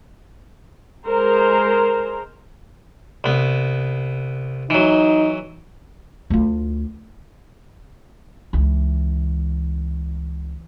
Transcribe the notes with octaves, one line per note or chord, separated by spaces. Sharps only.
G#3 A#4 C5 A#5
C2 B3
E3 F#3 D#4
D2 F4
C#2 E3